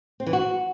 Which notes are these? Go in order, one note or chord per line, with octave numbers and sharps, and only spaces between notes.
C4
E3
F#4